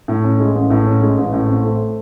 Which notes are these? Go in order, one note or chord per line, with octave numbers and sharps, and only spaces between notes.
A2
C#4
G#3
A1
A2
C#4
G#3
A1
A2
C4
A3